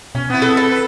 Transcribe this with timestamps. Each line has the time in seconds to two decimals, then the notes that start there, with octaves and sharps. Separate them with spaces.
0.15 B2 C#4
0.30 B3 C4 E4
0.42 A4
0.57 A4
0.71 B4